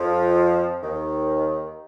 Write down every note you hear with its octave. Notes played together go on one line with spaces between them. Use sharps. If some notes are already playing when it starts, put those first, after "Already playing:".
Already playing: F2 F3
D#2 D#3